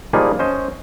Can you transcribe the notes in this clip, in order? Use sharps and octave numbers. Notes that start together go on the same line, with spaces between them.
F3 G3 A#3 D#4 G#4
C#4 C5 D#5